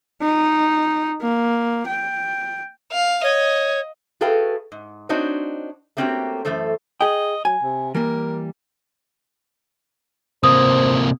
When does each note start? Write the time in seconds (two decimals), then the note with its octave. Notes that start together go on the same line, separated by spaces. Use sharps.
0.21 D#4
1.21 A#3
1.87 G5
2.92 F5
3.23 C#5 D#5
4.21 F#4 G#4 A4 B4 F5 G5
4.72 G#2
5.09 C4 D4 D#4 F#4 C5 C#5
5.97 A3 A#3 C4 C#4 F#4 G4
6.45 F#2 E3 A3 A4 C5
7.01 G#4 D#5 G5
7.45 F#3 G#5
7.63 C3
7.95 E3 G3 A#3 A#4
10.43 C3 A#3 C5 D#6